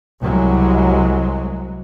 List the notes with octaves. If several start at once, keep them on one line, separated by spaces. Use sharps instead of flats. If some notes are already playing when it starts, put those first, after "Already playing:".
C2 F#3 G#3